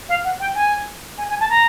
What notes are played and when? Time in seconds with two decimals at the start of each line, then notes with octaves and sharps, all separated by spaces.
0.09 F5
0.24 F#5
0.40 G5
0.55 G#5
1.18 G#5
1.29 G#5
1.40 A5
1.50 A#5